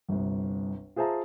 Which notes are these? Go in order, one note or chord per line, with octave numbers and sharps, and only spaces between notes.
G1 C2
F4 G#4 C5 E5 A5 A#5